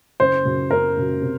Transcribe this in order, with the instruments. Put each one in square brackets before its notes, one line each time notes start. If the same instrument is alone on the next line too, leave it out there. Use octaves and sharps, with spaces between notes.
[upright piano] F#1 [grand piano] C5
[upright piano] F#2 C#3 F#3
[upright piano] F#1 [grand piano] A#4
[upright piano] F#2 C#3 F#3
C3